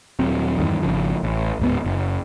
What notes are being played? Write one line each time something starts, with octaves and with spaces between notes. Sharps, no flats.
D#1 F#3 C4
E2 G2 D#3
G#1 C#3 F3
A1
D1 G#2 B3
F#1